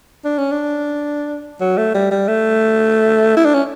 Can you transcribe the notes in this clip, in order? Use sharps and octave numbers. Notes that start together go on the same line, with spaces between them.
D4
C#4
D4
F#3
A3
G3
G3
A3
E4
D4
C#4